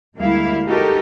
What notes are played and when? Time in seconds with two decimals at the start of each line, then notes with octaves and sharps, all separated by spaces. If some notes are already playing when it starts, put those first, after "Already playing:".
0.17 D2 G3 G#3 A#3 E4 F5
0.67 D#4 F#4 G4 A4 A#4